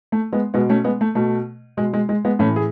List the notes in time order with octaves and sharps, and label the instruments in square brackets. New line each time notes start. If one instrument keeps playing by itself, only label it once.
[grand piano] A3
G#3 B3
B2 G#3 B3
A3 C#4
G#3 B3
A3
B2 A3
B2 G#3
G#3
G#3
G#3 B3
A2 E3 A3 C#4
G#4